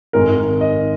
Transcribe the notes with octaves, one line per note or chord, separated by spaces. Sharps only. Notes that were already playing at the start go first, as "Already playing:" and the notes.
G#1 G#2 D#3 G#3 D#4 A#4
D#5